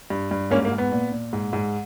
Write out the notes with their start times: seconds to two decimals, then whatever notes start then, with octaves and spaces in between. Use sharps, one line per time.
0.10 G2
0.31 G2
0.51 G#2 A#3 C#4
0.65 A#3
0.72 G#2
0.78 B3
0.92 A#2
1.12 A#2
1.33 G#2
1.53 G#2